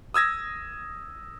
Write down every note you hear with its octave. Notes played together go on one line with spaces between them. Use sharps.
D#6 E6 G#6 A#6